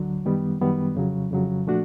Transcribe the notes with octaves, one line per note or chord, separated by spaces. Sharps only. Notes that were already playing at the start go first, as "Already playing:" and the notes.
Already playing: D2 D3 F#3
F#2 D#3 G3 B3
F#2 D#3 G3 B3
F2 C#3 F#3
F2 C#3 F#3
A#2 F3 A3 D4 F#4